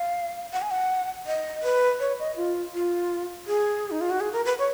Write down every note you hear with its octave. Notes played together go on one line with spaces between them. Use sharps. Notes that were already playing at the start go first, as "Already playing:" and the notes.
Already playing: F5
F#5
G#5
F#5
D#5
B4
C#5
D#5
F4
F4
G#4
D#4
F4
F#4
G#4
A#4
B4
C#5